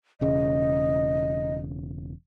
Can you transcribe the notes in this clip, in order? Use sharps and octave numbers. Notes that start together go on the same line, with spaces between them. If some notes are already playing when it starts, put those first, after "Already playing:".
E1 C#3 D#5